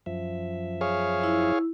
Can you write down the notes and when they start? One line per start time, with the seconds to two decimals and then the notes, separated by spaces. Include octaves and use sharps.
0.06 F#2 F3 E5
0.81 G#4 C#5 F5
1.23 E4